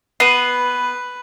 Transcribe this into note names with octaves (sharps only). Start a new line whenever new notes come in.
B3 B4 C7 D#7